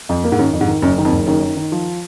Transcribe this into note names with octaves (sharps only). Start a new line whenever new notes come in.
F2
A#3
G#2
F#2 D#3
F2
G#2
D#3
F#1 F#2
D#3
F2
F#1
F#2 D#3
D#3
D#3
F3